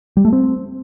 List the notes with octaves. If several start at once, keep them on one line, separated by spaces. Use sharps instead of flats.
G3
A3
C4